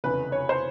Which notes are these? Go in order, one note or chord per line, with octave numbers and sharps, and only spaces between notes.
F1 E2 C#3 B4
C#5
C5